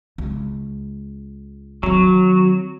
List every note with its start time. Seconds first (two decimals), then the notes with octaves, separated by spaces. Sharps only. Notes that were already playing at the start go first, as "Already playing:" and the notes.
0.18 C#2
1.83 D#3 F#3 C4